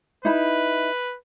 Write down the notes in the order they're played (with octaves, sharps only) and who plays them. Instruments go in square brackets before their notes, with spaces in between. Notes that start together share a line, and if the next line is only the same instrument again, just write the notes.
[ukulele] D#4 E4 B5 [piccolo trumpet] B4